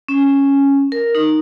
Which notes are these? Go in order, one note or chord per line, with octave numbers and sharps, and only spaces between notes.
C#4
A#4
D#4